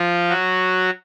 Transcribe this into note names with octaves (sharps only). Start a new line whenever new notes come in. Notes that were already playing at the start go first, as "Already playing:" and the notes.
Already playing: F3 F4
F#3 F#4